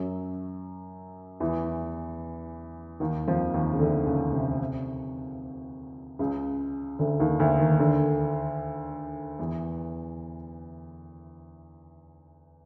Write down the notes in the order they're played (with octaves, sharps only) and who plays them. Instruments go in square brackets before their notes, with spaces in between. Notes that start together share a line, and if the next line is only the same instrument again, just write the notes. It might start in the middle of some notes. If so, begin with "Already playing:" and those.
Already playing: [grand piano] F#2 F#3
E2 E3
D#2 D#3
F2 F3
D#2 D#3
C#3
D2 D3
C#2 C#3
C3
C#2 C#3
D2 D3
D#2 D#3
D2 D3
D#2 D#3
D2 D3
E2 E3